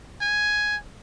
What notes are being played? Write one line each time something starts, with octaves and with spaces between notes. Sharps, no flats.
G#5